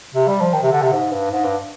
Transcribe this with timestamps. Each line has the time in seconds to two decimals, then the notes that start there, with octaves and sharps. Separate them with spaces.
0.14 C3
0.27 G3
0.40 F3
0.53 D#3
0.63 C3
0.72 D3
0.82 C3
0.92 G#2
1.12 G2
1.31 G#2
1.44 G2